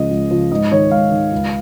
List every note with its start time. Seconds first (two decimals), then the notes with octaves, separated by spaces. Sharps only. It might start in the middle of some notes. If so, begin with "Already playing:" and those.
Already playing: C#2 C#3 F3 D#5
0.11 C#2
0.31 C#3 F3
0.52 G#2 D#5
0.72 D#3 C#5
0.91 G#2 F5
1.12 D#3
1.32 C#2